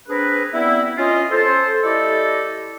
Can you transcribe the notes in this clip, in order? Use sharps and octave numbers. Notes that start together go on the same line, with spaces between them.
C4 D4 G#4 A#4 B4
G3 B3 C4 E4
C#4 F4 D#5
A4 C5
A3 E4 G4 A4 D5 D#5